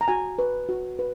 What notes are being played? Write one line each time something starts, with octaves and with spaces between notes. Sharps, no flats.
A#5
F#4 G#5
B4
F#4
B4